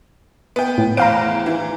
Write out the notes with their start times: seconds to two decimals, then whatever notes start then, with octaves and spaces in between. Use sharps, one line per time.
0.56 B3 G5
0.78 A2
0.97 E2 C5 F5 A#5 D7
1.46 E3